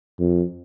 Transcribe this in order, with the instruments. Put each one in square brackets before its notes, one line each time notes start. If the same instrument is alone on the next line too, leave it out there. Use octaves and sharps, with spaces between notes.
[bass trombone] F2